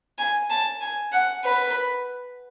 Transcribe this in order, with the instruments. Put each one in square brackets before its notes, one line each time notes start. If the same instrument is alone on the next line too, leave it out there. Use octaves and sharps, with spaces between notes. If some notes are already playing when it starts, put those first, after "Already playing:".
[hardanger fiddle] G#5
A5
G#5
F#5
B4